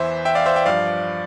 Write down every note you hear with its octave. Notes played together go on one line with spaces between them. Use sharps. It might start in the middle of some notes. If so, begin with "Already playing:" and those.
Already playing: E2 E3 C5 E5
E5 G5
D5 F5
C5 E5
E5 G5
G2 F3 D5 F5